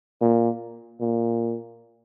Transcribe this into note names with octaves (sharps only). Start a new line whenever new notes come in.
A#2
A#2